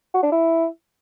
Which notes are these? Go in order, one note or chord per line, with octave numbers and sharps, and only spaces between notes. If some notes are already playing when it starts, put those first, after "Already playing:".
F#4
D4
E4